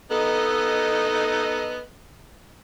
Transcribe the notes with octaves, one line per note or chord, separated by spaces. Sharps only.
B3 D#4 A4 D#5